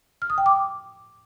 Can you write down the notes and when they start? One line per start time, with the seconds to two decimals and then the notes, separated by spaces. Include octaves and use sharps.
0.22 F6
0.30 D#6
0.38 G5
0.46 D6